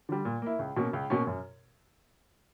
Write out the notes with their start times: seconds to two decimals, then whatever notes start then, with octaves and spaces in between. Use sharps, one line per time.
0.09 D3 G3
0.25 A#2
0.42 A#3 E4
0.59 C#2
0.76 B2 A#3 C#4
0.93 C#2
1.10 B2 A#3 C#4
1.27 F#2